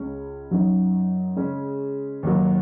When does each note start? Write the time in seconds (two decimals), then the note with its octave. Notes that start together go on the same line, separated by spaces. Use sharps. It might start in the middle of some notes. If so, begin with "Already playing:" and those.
Already playing: C#2 C#3 G#3 C#4
0.51 F#2 F#3 D#4
1.36 C#3 G#3 C#4
2.23 D#2 D#3 F#3